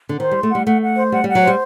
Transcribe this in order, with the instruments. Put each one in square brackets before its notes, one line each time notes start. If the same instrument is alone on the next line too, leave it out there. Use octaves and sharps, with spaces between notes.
[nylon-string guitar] D3
[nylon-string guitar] D#3 [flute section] C5
[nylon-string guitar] G3 [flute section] C6
[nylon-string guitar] A3
[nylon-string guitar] G3 [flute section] F#5
[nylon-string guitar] A3 [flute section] F#5
[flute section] F#5
C5
[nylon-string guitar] G3 [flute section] F#5
[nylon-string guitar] G3 [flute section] F#5
[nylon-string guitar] F#3
[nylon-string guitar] G3 [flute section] C5